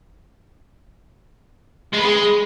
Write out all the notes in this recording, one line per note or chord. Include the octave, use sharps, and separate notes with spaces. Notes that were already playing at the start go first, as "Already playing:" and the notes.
G#3
B4
G#3